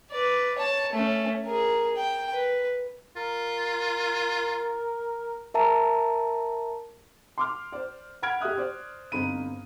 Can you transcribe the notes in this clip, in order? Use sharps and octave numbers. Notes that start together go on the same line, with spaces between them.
B4 D5
C#5 A5
A3 C#4
G#4 A#4
G5
B4
F4 A#4
A#4 E5 A5 A#5
C6 D6 F6
C5 D5
F#5 B5 F6 G#6 D7
G4 D#5 E5 D#6 F#6
C5 D5
G1 C4 D#4 B5 D#7